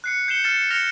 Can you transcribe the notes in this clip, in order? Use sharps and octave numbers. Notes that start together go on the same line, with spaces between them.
F#6 C7 C#7
G6 C7 C#7 E7 G7
F6 G6 A6 C#7 E7
F6 A#6 C#7 E7 F7 G7